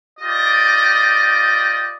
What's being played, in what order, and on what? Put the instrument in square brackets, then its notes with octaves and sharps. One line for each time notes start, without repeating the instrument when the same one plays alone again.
[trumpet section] F4 G4 D5 D#5